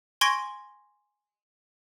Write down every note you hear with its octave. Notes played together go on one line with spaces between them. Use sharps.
G#5 C6 C#6 G#6 A#6 D7